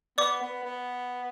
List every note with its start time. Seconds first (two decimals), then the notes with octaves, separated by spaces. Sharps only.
0.18 B3 D5 D6
0.42 B3
0.64 B3